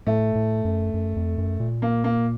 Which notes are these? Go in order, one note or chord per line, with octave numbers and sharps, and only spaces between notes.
A2 A3
A2
F#2
F#2
F2
F#2
A#2
A#3
A#3